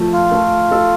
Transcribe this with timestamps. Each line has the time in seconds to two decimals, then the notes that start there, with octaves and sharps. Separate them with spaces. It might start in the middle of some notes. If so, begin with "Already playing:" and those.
Already playing: F3 A3
0.13 F4
0.32 A3
0.71 A4